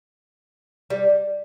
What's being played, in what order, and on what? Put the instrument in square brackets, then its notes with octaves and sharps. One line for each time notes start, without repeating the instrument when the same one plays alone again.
[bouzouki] G3